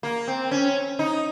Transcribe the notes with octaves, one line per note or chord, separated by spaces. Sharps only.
A#3
C4
C#4
D#4